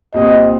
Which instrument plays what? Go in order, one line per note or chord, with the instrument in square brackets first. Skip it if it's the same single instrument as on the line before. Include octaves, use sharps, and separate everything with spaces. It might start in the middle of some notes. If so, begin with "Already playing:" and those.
[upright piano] C2 A#2 G3 C4 [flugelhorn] D#5